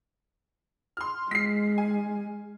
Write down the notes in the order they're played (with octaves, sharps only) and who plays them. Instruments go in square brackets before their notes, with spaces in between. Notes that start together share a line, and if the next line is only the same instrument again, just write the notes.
[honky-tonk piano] C6 F6
[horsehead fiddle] G#3 [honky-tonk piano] B6 C7
[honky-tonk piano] G#5